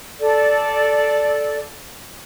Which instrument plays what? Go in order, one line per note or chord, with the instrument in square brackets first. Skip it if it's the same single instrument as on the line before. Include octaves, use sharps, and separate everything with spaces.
[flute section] A4 D5